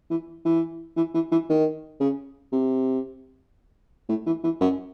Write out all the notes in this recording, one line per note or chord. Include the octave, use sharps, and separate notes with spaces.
E3
E3
E3
E3
E3
D#3
C#3
C3
A2
E3
E3
F#2